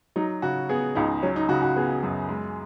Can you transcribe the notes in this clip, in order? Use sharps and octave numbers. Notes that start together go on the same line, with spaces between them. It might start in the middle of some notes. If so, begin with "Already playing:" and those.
F#3 D#4
C#3 F#4
B3 G#4
C#2 D#4
F#3 C#4
D#4
C#3 F#4
F#4
B3 G#4
F#2
G#3